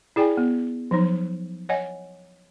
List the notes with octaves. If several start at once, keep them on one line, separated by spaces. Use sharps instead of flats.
E4 G#4 D5 G5 G#5
B3
F3 F#3 D#4
C#5 D#5 F#5 G#5